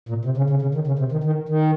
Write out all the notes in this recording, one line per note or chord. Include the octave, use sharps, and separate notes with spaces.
A#2
C3
C#3
C#3
C#3
D#3
C#3
C3
D#3
D#3
D#3